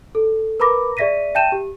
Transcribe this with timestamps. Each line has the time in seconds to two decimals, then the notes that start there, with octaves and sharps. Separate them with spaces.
0.15 A4
0.60 A#4 B4 A#5 B5 D6 A#6
0.97 G#4 D5 E5 A#6 B6 D#7
1.35 E5 G5 A5 G6 D#7 E7
1.52 G4